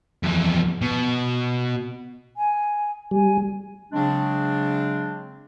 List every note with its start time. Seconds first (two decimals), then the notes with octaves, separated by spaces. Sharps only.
0.23 F2 E3
0.81 B2
2.36 G#5
3.11 G3 G#5
3.93 C#3 F#3 G#3 C4 D4